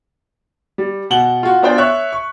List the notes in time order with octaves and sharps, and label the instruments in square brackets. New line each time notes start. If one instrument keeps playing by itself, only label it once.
[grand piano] G3
B2 F#5 F#7 G7
F4 F#4
B3 D4 F4 C5 D5 G5
C#5 E5 C#6 F#6
C#6